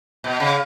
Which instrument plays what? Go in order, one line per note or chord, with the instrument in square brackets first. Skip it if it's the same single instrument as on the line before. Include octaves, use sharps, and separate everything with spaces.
[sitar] B2
C#3